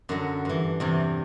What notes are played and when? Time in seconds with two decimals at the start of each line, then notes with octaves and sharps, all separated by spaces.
0.09 F#2 D3 F#4
0.45 G2 E3
0.80 E2 C3 E3